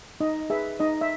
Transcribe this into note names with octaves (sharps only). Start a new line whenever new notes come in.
D#4 D#5
G#4 B4 E5
D#4 D#5
E5